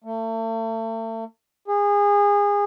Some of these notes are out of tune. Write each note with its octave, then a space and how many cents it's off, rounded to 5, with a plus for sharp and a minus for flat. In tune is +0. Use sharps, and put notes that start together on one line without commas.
A3 +40
G#4 -25